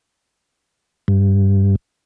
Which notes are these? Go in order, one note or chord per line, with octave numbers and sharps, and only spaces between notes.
G2